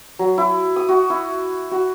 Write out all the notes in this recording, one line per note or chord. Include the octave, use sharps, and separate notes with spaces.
F#3
E4
D#6
F#4
E4
F#4